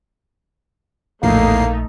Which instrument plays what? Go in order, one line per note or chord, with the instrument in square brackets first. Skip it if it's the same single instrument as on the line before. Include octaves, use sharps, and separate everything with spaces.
[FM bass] A#1 [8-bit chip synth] E2 A2 C7 [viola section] A3 D#4 [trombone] A#3